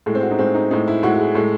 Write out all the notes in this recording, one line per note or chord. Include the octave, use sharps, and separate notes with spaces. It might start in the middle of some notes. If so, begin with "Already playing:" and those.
A2 G#3 A3
C4
F#4
D#4
A2 G#3 C4
D#4
A2 G#3 D#4
E4
A2 G#3 F#4
F#4
G#4
A2 G#3 A4